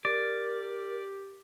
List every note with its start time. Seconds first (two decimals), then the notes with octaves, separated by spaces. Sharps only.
0.05 G4 A#4 D5